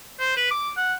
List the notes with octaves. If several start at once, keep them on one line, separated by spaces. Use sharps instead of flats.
C5
B4
D6
F#5